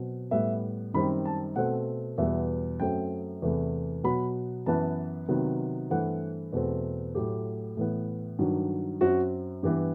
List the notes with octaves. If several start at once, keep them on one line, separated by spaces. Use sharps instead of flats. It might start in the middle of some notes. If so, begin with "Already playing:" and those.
Already playing: B2 F#3 C4
A2 G3 B3 E5
F#2 D#3 G3 C4 B5
A5
B2 A3 C4 F#5
E2 B2 G3 B3 E5
F#2 F#3 A3 C4 G5
E2 C3 E3 A3
B2 F#3 B3 B5
F#2 E3 B3 A5
C3 D#3 F#3 B3
G2 E3 A3 C4 F#5
E2 B2 A3 C4
A2 F#3 A3 G4
A2 E3 B3
G2 D#3 F#3
F#2 F#3 C4 F#4
G2 E3 B3 G4